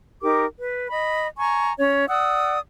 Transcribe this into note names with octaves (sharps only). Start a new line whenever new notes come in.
D#4 G4 A#4 D6
B4
D#5 B5
G#5 A#5 C#6
C#4 C#5
D5 F#5 D#6 E6